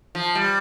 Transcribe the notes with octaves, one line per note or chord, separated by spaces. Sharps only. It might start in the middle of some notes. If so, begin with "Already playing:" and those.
F3
G3